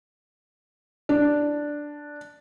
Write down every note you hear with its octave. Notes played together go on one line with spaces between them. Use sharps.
D4